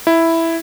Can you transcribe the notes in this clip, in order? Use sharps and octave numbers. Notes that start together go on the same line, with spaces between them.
E4